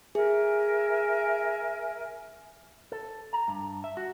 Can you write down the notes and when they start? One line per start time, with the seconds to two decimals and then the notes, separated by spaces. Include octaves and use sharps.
0.15 G#4 A#4 E5 G#5
2.92 A4
3.33 A#5
3.48 G2
3.84 E5
3.97 F#4